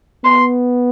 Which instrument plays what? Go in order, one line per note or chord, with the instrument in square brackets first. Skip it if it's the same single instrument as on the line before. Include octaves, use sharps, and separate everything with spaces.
[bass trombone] B3 [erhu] C6